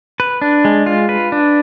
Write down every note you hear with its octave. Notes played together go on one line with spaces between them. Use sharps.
B4
D4
G#3
F4
B4
D4